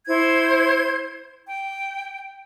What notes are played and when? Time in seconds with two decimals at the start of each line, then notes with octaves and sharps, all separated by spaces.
0.07 E4 C5 G#6
1.47 G5